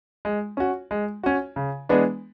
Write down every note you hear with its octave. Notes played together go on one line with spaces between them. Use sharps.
G#3
C#4 F#4
G#3
C#4 F#4
C#3
E3 G#3 B3 D4